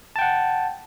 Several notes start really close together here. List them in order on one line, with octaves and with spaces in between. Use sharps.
A5 G5 F#5